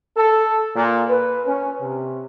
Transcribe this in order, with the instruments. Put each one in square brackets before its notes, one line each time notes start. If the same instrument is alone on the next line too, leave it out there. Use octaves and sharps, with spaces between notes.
[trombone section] A4
A#2
B4
C#4
C3